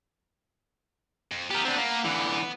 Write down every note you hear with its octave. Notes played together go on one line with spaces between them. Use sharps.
F2
B3 G4 A#4
C4 D4
A#3
D3 E3